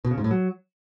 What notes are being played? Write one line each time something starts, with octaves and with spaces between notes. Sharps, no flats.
B2
C#3
G#2
A2
F#3